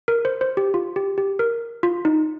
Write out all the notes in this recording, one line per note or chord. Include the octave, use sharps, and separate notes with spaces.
A#4
C5
C5
G4
F4
G4
G4
A#4
F4
D#4